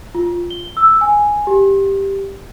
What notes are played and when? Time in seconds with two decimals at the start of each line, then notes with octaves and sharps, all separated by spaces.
0.15 F4
0.50 G7
0.77 E6
1.01 G#5
1.47 G4